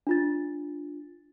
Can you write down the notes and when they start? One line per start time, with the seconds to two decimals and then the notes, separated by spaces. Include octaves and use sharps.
0.07 D4 F4 A6